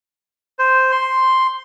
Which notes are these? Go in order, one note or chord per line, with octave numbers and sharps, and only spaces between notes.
C5
C6